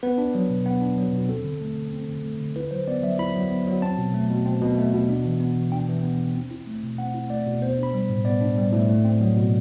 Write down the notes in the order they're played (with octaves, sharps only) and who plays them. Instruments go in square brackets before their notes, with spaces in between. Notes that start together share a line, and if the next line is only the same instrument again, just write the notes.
[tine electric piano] B3 B4
D4
F#3
B2
B3
D4
F#3
B2
C4 A4
D3
A3
D3
C4
D3
A3
D3
E4 B4
F#3 C5
B3 D5
F#3 E5
E4 B5
F#3
B3
F#3
C4 A5
B2
A3
B2
C4
B2
A3
B2
D4
E3
B3
E3
D4 G5
E3
B3
E3
C4
E4
A3
B2
C4 F#5
E4
A3 D5
B2
B3 C5
D4
B5
G3
A2
B3 D5
D4
G3
A2
A3
C4
F#3
B2